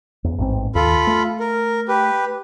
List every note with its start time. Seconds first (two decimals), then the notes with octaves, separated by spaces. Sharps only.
0.24 E2
0.38 A1 G#2 C4
0.75 D#2 F4 A4 B5
1.07 A3
1.40 A#4
1.88 G4 B4